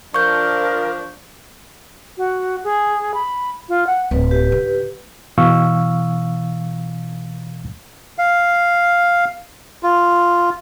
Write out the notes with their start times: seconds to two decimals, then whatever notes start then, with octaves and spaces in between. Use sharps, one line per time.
0.14 F3 D4 A#4 C#6 G6
2.17 F#4
2.64 G#4
3.14 B5
3.69 F4
3.87 F#5
4.11 D1 B4
4.31 G4 B4
4.52 D3
5.38 B2 E3 F5 C#6 E6
8.18 F5
9.83 F4